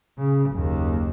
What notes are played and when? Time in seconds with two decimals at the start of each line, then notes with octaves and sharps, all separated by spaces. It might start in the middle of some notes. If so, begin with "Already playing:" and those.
0.18 C#3
0.51 F#1 D#2